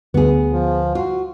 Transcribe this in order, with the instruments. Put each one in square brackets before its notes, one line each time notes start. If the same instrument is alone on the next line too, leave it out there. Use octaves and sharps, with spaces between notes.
[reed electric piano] D2 [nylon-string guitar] B3 G#4
[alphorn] F3
[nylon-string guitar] F4 [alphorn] F#4